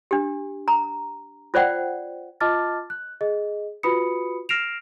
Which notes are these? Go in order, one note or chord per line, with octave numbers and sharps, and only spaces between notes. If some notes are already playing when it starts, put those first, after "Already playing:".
D4 G4
A#5
F4 C5 D5 F#5 G5
F4 D#5 A5 D6 F6 A6
F#6
G#4 D#5
F4 F#4 B4 B5 D#6 C#7
F6 A#6 C7 D7 E7 F7